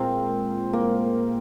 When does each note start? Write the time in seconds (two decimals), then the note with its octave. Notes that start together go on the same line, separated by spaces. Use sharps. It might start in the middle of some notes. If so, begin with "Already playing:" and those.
Already playing: A#2 G#3 C4 F4 A#4
0.73 A#3